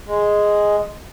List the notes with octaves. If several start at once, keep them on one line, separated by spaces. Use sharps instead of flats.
G#3